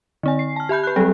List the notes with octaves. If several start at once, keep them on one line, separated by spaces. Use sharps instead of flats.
D3 C4 G#5
C7
A5 F6
G4 E5 B5 G6
B4 F#6
F#3 G3 C4 A4